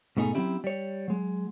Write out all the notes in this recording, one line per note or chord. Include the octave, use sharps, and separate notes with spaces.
G#2 B2 A3 D#4 G#4
F#3 G#3 C4 C#4 E4 G4
G3 C#5
F#3 G#3